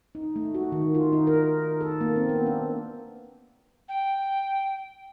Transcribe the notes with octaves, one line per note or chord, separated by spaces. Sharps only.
D#4
A3
F#4
D#3
F4
D#4
A#4
A4
A#3
C4
B3
D4
G5